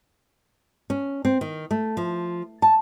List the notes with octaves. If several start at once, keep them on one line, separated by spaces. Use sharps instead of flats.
C#4
C4
D#3
A3
F3
A5